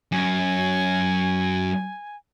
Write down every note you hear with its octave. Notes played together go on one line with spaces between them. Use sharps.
F#2 G#5